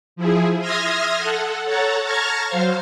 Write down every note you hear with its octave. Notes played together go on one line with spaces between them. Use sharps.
F3 E4 G#4
E5 C6 D#6 F6 G#6 A#6
A4 F#5
A4 C#5 F#5 A5 A#5
A5 A#5 C#6 F6 G#6 A#6
F#3 C5 F5